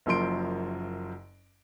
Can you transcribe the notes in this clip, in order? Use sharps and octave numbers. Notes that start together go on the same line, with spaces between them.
F#1 F#2 F3 C6 D7